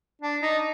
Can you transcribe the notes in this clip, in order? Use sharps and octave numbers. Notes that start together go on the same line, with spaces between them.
D4
D#4